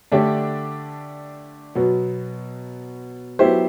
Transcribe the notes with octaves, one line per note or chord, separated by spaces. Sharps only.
D3 A3 D4 G4 D5
B2 F#3 B3
F#3 B3 E4 G4 C5